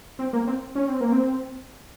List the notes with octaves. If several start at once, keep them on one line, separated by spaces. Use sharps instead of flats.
C4
A#3
C4
C#4
C4
A#3
C4